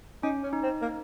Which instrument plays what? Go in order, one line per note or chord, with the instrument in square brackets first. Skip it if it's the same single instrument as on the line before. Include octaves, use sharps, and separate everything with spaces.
[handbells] C#4 [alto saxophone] D#4
[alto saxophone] C#4
[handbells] D#4
[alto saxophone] C4
A#3